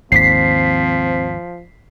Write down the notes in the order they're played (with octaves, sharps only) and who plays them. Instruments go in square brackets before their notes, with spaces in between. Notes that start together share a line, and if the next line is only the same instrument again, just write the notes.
[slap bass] G#1 D#2 [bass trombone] F3 [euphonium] C4 [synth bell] B6 C7